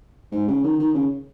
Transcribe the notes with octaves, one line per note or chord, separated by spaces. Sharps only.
G#2
C#3
D#3
D#3
C#3